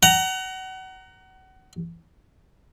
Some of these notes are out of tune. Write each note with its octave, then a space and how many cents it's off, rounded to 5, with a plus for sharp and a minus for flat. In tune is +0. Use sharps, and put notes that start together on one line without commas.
F#5 +30 A#5 +0